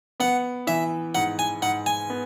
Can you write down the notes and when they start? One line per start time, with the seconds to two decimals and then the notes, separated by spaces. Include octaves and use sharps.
0.20 B3 F#5
0.67 E3 E5
1.15 G#2 F#5
1.39 G#5
1.62 G#2 F#5
1.86 G#5
2.10 B3